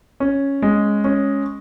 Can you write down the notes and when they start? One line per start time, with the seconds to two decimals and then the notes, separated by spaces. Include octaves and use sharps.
0.20 C#4
0.62 G#3
1.04 C#4